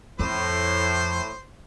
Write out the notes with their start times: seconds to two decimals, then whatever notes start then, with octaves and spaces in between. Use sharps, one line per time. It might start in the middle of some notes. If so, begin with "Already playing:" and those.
0.19 F2 A2 C5